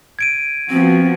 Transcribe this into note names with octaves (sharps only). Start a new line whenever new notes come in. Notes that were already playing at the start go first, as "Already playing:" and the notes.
G#6 D7 D#7
F3 B3 C4 F#4